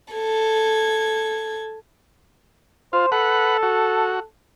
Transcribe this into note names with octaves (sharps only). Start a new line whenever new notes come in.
A4 G#6
F4 C5
A4 B4 F#5
F#4